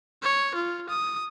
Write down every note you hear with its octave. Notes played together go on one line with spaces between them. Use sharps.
C#5
F4
D#6